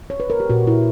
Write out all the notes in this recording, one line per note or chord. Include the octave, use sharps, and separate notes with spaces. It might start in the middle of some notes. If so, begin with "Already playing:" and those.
C#5
B4
A#4
G4
A#2 F#4
A#2 E4